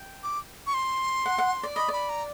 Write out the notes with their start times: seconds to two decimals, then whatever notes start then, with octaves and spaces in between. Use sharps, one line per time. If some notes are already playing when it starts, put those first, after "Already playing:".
Already playing: G5
0.23 D6
0.67 C#6
0.74 C6
1.26 F#5
1.38 F#5
1.63 D5
1.76 D#5 B5
1.88 D5 B5
2.09 A#5